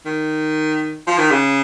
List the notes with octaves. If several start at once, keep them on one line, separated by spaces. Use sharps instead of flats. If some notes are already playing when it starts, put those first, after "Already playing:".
D#3
F3
D#3
C#3